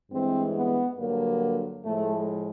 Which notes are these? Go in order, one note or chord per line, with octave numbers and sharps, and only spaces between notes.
G2 E3 G#3 C4
B3
G2 D3 F#3 A#3
A2 F3 G#3 A3